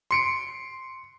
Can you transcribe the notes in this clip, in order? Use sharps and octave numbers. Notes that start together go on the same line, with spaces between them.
C6 C#7 D7